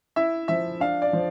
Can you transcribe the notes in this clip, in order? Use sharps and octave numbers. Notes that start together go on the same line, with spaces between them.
E4 E5
F3 E5
D4 F5
D5
F3